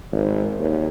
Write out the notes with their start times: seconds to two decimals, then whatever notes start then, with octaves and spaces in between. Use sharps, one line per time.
0.12 G#1
0.59 D#2